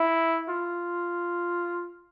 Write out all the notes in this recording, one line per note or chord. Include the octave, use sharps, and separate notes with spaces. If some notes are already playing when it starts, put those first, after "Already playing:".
Already playing: E4
F4